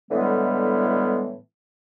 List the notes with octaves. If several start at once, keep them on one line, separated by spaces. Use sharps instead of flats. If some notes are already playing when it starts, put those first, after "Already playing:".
A2 D3 E3 G3 G#3 B3